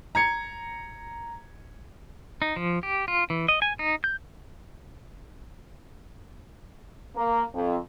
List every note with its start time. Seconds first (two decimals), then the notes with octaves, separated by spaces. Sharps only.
0.15 A#5 G#6 C#7
2.42 D#4
2.56 F3
2.83 G4
3.08 F4
3.30 E3
3.48 D#5
3.62 G#5
3.79 D#4
4.04 G6
7.16 A#3
7.54 F2